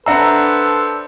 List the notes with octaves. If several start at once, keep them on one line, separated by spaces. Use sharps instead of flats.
D4 A4 B4 C5 E5 F#5 A#5 E6